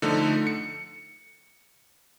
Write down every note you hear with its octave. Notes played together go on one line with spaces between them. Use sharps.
D3 F3 A3 D#4
C#7